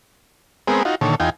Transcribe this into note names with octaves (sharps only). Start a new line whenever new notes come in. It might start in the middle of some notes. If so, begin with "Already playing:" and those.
G#3 B3 C4 G#4 A#4
D#4 F4 F#4
A#2 D3 D#3 A4 C#5
E2 D#4 F4 G5 G#5